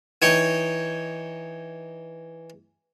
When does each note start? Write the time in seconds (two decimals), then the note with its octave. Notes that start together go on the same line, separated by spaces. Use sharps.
0.22 E3 D#4 C#5 G5 C#6